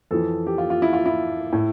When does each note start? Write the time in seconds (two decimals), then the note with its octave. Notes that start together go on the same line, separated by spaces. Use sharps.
0.11 F2 E3 A4
0.47 G4
0.58 F4
0.70 F4
0.82 E4
0.93 F4
1.06 E4
1.53 A2